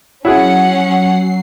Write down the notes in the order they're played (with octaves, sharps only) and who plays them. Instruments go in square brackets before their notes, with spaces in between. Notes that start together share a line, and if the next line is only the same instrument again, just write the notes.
[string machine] F#3 C7 [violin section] C#4 F#5 [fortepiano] E4 F#4 G#4